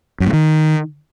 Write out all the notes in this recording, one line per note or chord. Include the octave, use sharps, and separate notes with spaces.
F#2
A2
D#3